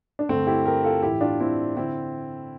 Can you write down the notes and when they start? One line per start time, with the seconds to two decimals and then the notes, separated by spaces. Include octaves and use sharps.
0.19 D4
0.29 G2 D3 A3 C4
0.47 E4 G4
0.65 G4 A#4
0.84 F4 A4
1.03 A2 E3 E4 G4
1.21 D4 F4
1.40 C4 E4
1.76 D3 C4 E4